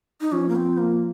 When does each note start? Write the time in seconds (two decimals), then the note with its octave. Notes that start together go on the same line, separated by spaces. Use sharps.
0.21 D#4
0.32 F3 C#4
0.49 A#3
0.56 C4
0.78 A#3